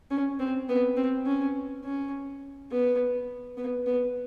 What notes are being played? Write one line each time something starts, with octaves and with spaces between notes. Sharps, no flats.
C#4
C4
B3
C4
C#4
C#4
B3
B3
B3